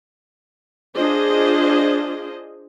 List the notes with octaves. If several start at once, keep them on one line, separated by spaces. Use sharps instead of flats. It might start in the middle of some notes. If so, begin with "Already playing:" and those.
D4 F4 G#4 C5 D#5